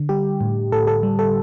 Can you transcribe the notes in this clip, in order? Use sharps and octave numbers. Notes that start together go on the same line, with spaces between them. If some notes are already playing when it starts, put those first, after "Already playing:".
Already playing: D3
G3 G4
A2
A2 A4
A4
G3
A4